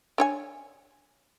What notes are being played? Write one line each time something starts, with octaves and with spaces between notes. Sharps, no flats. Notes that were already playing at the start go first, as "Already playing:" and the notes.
D4 C#5 G#5